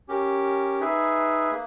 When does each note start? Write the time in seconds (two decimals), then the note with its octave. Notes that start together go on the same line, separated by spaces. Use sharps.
0.08 C#4 G4 A#4
0.80 D#4 G#4 B4 E5
1.51 A#3